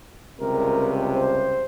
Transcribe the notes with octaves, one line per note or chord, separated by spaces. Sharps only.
C#2 C3 G3 A#4
C5